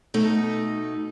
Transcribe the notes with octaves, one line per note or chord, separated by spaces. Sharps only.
B2 A3 D#4